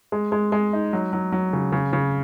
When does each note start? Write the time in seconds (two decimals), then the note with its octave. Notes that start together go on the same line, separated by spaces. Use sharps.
0.12 G#3
0.32 G#3
0.52 G#3
0.73 D#4
0.93 F#3
1.13 F#3
1.32 F#3
1.53 C#3
1.72 C#3
1.93 C#3